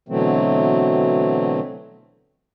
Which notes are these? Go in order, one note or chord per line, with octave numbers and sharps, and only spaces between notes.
B2 D3 E3 F#3 A3 C4